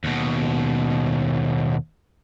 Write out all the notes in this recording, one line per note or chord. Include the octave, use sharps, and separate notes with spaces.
D#2 B2